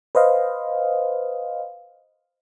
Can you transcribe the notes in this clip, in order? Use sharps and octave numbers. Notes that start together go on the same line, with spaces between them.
B4 C5 D#5 F5